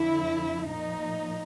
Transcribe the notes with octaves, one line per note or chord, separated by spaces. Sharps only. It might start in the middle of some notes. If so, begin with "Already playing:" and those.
Already playing: F2 D3 F3 E4
A#2 F3 D#4